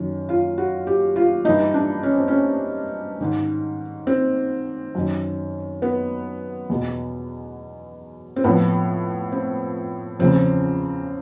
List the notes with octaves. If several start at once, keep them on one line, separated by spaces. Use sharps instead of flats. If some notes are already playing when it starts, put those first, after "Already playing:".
Already playing: F#2 D#3
F4
F#4
G4
F4
G2 E3 D#4
D4
C#4
C4
C#4
G#2 D#3
C4
F#2 D#3
B3
E2 B2
C4
A2 F3 B3
C4
E2 C#3 F3 C4